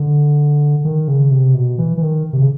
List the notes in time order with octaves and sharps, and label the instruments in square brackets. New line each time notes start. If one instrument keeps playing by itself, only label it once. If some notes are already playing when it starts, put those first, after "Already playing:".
Already playing: [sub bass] D3
D#3
C#3
C3
B2
E3
E3
D#3
C3
C#3